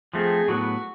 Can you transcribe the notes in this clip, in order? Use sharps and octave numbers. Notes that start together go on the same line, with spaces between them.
F3 A3 C4 G#4
A2 F#3 B3 F#4